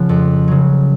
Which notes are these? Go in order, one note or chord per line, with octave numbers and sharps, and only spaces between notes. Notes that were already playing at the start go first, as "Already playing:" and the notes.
Already playing: C#3 F3 F#5
F2
C#3 F#3